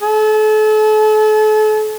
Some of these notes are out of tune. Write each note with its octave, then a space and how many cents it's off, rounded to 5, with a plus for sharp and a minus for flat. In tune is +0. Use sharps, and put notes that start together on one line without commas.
A4 -40